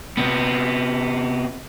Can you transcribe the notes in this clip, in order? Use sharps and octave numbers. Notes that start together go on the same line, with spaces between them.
C3 B3